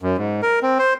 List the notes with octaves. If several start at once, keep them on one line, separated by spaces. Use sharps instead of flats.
F#2
G#2
A#4
C4
C5